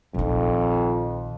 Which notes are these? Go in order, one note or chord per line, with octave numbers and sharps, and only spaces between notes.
A#1 F2 D#3